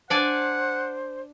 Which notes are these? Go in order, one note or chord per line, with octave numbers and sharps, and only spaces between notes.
D4 C5 D5 F#5 G#5